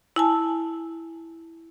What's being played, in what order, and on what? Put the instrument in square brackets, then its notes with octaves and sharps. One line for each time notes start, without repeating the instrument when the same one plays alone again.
[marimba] E4 G#5 A5